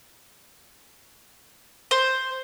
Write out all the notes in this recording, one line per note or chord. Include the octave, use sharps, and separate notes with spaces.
C5